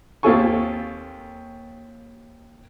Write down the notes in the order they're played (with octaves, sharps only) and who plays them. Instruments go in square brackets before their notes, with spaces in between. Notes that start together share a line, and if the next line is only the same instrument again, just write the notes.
[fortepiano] D#2 C4 F4 A4 G#5 C#6